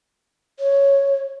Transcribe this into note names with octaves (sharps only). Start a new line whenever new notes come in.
C#5